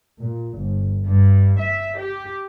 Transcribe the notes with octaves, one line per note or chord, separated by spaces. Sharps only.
A#2
G1
G2
E5
G4